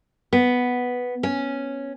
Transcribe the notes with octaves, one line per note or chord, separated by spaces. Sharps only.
B3
C#4